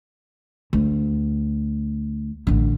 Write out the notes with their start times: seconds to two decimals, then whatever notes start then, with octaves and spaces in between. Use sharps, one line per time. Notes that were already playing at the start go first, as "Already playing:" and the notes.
0.73 D2
2.47 A1 D3